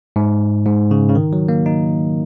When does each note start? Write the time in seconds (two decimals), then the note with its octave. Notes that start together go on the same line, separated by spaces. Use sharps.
0.16 G#2
0.66 G#2
0.91 C#3
1.09 C#3
1.15 D#3
1.33 F#3
1.49 A#3
1.66 D#4